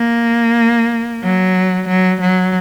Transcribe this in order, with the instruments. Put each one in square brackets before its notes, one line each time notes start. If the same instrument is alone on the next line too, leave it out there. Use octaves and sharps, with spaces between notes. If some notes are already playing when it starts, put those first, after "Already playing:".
Already playing: [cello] A#3
F#3
F#3
F#3